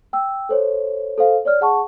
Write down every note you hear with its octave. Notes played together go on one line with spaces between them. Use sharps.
G5 E6
A4 C5 C#5
A4 C5 F5
C#5 D5 F6
G#4 F#5 A5 C#6